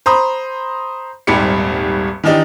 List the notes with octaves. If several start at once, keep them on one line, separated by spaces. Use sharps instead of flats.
C5 A#5 B5 D#6
D#1 G#1 G3 G4 B5 C#7
D#3 E3 D4 D#4 G4